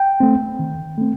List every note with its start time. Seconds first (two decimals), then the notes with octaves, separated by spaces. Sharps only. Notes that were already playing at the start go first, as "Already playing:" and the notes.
Already playing: G5
0.20 A3 C4
0.59 D#3
0.98 A3 C4